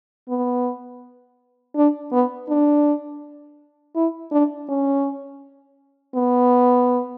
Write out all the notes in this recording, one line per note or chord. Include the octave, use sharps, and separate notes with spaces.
B3
D4
B3
D4
E4
D4
C#4
B3